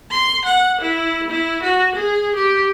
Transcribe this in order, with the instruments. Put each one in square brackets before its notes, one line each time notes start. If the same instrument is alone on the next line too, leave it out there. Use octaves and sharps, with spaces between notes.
[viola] C6
F#5
E4
E4
F#4
G#4
G4